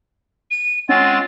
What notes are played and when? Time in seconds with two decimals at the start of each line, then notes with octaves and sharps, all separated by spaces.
0.51 D#7
0.89 G#3 C4 C#4 F4 F#5 A6